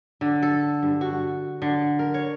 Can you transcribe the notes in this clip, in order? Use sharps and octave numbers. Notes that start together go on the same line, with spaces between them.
D3
A4
G2
F#4
D3
A#4
C#5